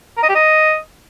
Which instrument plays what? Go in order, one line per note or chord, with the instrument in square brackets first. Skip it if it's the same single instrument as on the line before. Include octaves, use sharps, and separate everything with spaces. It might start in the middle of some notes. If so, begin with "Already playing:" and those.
[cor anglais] A#4
D#5
G4
D#5